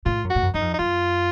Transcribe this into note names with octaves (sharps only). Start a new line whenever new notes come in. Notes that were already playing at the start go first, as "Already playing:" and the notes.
A2 F4
F#2
F#4
A2
F#2
F#2 D#4
F2
D#4
F#2 F4